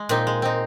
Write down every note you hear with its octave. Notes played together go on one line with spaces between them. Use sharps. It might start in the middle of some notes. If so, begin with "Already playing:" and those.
Already playing: G#3
A#2 C4 D#4
G#3
C4 D#4